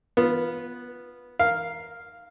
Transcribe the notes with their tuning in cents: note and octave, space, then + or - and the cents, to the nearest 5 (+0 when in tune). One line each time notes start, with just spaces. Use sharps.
B3 -10 F4 +0
A#4 +0 F5 +0